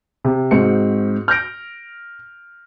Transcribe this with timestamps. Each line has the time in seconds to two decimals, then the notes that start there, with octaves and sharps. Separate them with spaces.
0.25 C3
0.51 G#2 C4 F#4 C#7
1.28 F6 G6 A#6 D7